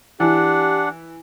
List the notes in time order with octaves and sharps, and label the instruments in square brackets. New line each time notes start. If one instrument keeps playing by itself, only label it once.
[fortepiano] E3 [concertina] D4 F#5 [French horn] G4